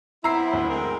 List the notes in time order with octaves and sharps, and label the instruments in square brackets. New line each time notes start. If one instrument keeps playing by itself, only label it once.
[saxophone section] B3 C4 E4 [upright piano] A#5 E6 C7
[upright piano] D2
[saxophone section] G#3 C4 A#4